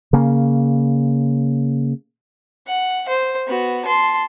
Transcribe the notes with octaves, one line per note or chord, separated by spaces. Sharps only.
C#3 A#3
F#5
C5
B3 F#4
A5 C6